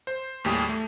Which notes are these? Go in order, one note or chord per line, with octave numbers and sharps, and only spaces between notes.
C5
D#2 A2 G3 G4 G#4
A3